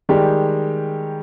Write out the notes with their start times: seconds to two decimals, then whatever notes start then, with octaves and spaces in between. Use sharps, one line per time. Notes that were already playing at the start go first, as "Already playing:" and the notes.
0.09 D#3 G3 G#3 G4